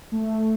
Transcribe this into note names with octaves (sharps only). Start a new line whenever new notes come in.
A3